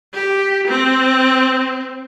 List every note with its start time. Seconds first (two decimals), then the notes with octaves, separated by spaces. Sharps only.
0.14 G4
0.68 C4